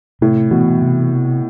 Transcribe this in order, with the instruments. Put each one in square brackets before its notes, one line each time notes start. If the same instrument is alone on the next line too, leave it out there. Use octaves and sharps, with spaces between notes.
[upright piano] A2 [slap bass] C3
[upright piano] B2 [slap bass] E3
[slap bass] C3